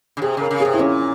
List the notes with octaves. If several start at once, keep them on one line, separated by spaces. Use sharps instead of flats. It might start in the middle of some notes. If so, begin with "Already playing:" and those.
C#3
C3 G#4
C#3 A#4
C#3
C3 G#4
E4
A#2 C#4